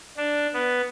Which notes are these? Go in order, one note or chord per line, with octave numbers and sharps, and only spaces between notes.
D4
B3